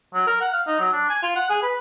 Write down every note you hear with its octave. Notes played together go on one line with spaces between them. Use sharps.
F#3
A#4
F#5
F5
D#4
F#3
D4
G#5
F4
F#5
G#4
B4